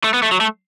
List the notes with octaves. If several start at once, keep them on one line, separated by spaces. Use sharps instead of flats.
A3
B3
A3
F#3
A3